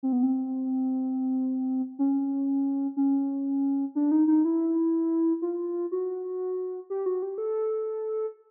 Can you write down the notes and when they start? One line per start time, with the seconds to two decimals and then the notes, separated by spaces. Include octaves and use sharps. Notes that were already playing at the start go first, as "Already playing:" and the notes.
0.03 C4
0.12 B3
0.23 C4
1.99 C#4
2.97 C#4
3.95 D4
4.11 D#4
4.28 D#4
4.45 E4
5.42 F4
5.92 F#4
6.90 G4
7.06 F#4
7.23 G4
7.38 A4